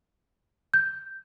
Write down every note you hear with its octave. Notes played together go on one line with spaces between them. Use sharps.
G6